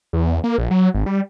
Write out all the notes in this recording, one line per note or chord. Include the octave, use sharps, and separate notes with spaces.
E2
A#3
A#1
F#3
G#1
G3